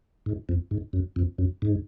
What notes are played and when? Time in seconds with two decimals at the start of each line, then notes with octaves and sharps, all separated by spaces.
0.26 G#2
0.49 F2
0.71 G#2
0.93 F#2
1.16 F2
1.38 F#2
1.62 G#2